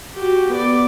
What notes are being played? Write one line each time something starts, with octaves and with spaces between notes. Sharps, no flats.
F#4 G4
B3 D5